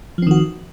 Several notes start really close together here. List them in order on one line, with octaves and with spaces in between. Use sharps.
F3 C4 D#3 F#4